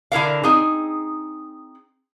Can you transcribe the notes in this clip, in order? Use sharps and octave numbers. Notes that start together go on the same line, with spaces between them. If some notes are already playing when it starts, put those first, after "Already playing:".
D3 E4 A#4 F5
C4 D#4 G#4